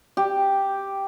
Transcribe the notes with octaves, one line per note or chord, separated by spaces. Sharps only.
G4